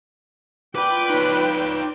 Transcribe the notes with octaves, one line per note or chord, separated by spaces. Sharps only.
F4 B4 D5 G5 B5 D6
D#4 B4 C#5